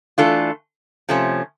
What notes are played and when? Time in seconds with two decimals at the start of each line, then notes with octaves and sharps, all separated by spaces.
0.18 E3 A3 D4 F4 A4
1.09 C3 F3 A3 C#4